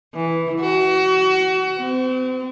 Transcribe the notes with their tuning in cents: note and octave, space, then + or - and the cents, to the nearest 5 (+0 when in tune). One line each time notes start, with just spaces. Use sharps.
E3 +0
F#4 +30
C4 -35